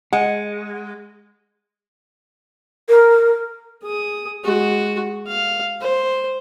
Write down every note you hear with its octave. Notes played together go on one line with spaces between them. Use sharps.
G#3 F#5
A#4
G#4 D#6
G#3 F#4
F5
C5